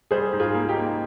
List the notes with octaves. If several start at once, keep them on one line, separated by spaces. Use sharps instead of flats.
G3 G#4 C5
G#2
F4 G#4
A#3
D#4 G4
A#3